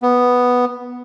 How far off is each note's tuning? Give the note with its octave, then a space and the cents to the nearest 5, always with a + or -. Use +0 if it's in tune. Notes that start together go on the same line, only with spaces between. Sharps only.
B3 +0